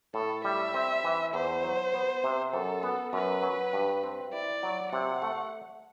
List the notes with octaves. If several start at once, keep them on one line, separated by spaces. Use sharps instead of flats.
A2 A4
G3 E5
C4
E3
E2 C5
F#3
B3
C3
F#2 A4
B3
F#2 B4
F#3
G2
C4
E4 D5
F#3
C3 F#5
A3